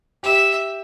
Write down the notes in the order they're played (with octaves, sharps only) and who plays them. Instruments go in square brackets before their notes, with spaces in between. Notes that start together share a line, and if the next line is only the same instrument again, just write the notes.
[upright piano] G4 [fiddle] E5